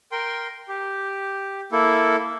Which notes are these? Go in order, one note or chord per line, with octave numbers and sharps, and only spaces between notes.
A#4 G5 C6
G4
A#3 E4 A4